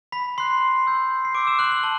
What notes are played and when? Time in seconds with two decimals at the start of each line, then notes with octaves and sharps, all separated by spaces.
0.12 B5 B6
0.38 C6 F#6 C7
0.86 C6 E6 G6
1.25 C7
1.35 C6 D6 E6 G6 D7
1.47 E6 E7
1.59 F#6 F#7
1.71 F#6 F#7
1.83 A5 G7